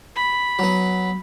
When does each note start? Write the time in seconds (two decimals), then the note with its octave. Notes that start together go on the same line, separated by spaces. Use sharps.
0.16 B5
0.59 F#3 B3